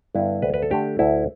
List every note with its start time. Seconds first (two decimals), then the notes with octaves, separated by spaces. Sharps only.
0.15 G2 D3 B3 E4
0.42 D2 B4
0.54 B4
0.62 A4
0.70 D3 A3 D4 G4
0.99 D2 E4